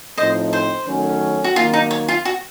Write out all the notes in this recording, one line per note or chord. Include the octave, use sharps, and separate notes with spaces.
A2 F3 C4 D#4 C5 D#5
C5
D#3 F#3 A3 C#4
F#4
D#3 F#3 A#3 F4
D#4
C#5
F4
F#4